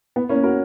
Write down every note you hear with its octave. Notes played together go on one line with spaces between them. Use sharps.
B3
A#3 C#4
F#4 A#4